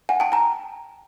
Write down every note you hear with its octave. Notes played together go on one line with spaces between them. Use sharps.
F#5 G#5
G5 A5
G#5 A#5